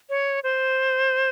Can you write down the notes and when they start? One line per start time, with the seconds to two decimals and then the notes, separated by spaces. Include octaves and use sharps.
0.10 C#5
0.44 C5